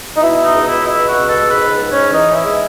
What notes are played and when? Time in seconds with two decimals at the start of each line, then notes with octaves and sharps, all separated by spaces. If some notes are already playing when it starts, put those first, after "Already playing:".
0.16 D#4
0.22 B2 E4
0.43 D#4
0.54 C#2
0.65 E4
0.86 B2 E4
1.07 F#4
1.18 C#2
1.28 A4
1.49 G#2 B4
1.81 G#2
1.92 C#4
2.12 E3 D#4
2.34 E4
2.44 G#3